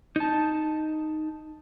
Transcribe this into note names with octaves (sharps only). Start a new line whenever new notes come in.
D#4 A5